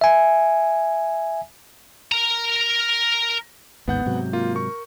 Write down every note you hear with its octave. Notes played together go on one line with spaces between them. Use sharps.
E5 G#5
A#4 A#5
A1 D#2 G#2 B3 F#5 G6
G#2 C3 F#3
A#3 F4
A#4 C#6